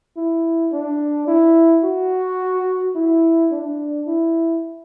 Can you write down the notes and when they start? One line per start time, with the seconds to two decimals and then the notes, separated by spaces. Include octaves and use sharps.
0.17 E4
0.72 D4
1.27 E4
1.84 F#4
2.96 E4
3.51 D4
4.07 E4